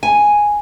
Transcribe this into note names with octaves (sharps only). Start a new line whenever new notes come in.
G#5